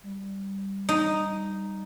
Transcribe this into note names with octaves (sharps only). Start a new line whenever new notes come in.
G3
D#4